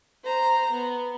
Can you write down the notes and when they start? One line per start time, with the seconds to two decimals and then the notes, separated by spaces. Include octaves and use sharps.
0.23 C5 A#5
0.70 B3